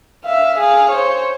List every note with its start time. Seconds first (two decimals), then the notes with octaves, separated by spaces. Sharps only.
0.24 E5 F5
0.59 G#4 F5
0.90 C5 C#5